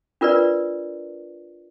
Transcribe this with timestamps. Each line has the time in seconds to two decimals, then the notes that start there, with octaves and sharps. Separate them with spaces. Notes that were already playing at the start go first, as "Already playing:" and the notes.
0.21 D4 F4 A#4 B4 D5